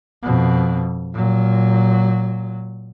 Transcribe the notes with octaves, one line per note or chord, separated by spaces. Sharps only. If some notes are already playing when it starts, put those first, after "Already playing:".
F2 B2
A#2 F#3